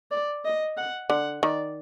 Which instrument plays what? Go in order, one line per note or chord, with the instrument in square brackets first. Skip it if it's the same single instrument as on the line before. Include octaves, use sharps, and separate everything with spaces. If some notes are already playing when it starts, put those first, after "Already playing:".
[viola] D5
D#5
F#5
[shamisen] D3 [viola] F#5
[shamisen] D#3 [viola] D5